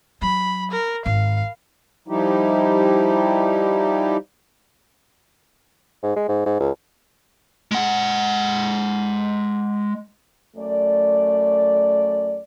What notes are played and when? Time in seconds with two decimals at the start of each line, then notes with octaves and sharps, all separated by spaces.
0.22 F#3 B5
0.72 A#4
1.06 G#1 F5
2.08 F3 G3 D#4 E4 G4
6.03 G#2
6.16 G#3
6.29 G#2
6.46 G#2
6.60 C#2
7.72 G#3 F#5
10.57 F#2 A3 D5